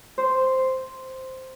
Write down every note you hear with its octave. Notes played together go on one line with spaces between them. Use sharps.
C5